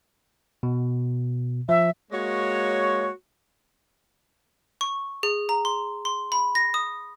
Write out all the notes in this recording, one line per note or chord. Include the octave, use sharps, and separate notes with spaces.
B2
F3 E5
G#3 A#3 F#4 C#5
C#6
G#4
A#5
C6
C6
B5
A#6
D#6